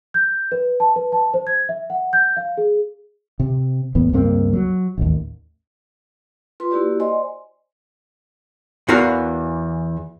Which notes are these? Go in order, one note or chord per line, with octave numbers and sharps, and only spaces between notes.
G6
B4
A5
B4
A5
C5
G#6
E5
F#5
G6
F5
G#4
C3
E2 A2 B3
C#2 G2 A#3 C4
F#3
A1 D#2
F4 B4 C6
A#3 E4 F#4 G4 D5
C5 D5 D#5 G#5 C6
E2 E3 F#4 A#4 F5 A#5